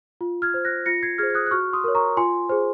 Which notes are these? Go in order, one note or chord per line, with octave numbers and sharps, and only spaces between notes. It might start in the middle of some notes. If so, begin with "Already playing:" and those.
F4
F6 G#6
C5
F#6 A#6
F4 A#6 C#7
G#6 C7
G#4 C5 F6 G#6
G#6
D#6 F#6
F#6
F#4 C#6 F6
C6 D#6
A#4 C#5
A#5 C#6
F4 G#5 C6
G#4 C5